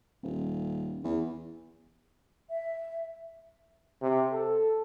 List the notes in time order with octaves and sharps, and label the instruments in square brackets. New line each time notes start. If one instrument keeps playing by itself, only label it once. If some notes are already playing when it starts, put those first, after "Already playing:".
[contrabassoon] D#1
E2
[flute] E5
[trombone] C3
A4